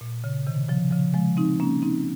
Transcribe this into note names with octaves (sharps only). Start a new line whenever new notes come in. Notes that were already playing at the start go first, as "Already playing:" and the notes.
A#2
C#3
C3 D#3
C#3 F3
C#3 F3
F3 G#3
C4 D#4
A#3 C#4
C4 D#4